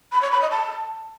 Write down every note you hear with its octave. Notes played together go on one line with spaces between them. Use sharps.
B5
C#5
B5
D#5
A5